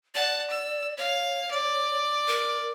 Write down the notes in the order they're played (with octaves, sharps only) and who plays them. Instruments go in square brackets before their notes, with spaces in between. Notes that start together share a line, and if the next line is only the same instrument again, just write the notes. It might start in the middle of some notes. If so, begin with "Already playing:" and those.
[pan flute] D5 [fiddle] F#5 A5
[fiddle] E6
[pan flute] C#5 [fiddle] F5
[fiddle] D5
[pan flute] A#4